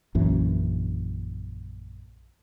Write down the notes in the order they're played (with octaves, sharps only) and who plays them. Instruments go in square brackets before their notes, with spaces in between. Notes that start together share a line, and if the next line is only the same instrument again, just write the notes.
[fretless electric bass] A#1 F#2 E3